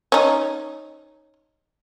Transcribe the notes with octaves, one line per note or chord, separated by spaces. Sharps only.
C#4 D#4